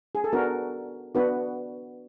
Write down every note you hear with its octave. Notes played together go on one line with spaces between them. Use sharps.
G#4
A4
B3 D4 F#4 A#4
B3 D4 F#4 B4